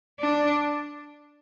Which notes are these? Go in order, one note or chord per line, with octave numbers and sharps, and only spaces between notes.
D4